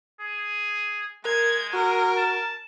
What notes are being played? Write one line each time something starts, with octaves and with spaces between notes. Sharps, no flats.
G#4
G#3 A#4 G#6
F#4 A#4
A5